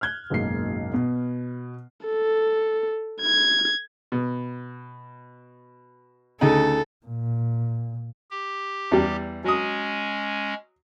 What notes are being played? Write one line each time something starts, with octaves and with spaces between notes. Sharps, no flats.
F6 F#6 G#6 G7
F#1 B1 G#2 A#3 C7
B2 B3
A4
G#6
B2
D2 C#3 D#4 A4
A#2
G4
E2 G3
F#3 G#3 C#4 D#6